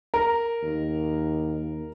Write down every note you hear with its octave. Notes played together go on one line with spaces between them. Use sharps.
A#4 A#5
D#2